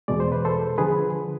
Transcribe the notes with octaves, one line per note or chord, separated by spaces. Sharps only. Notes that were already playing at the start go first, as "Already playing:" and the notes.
E2 B2 G#3 D5
C5
B4
A4 C5
D3 F3 G#4 B4